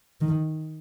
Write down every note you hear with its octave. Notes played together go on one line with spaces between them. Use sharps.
D#3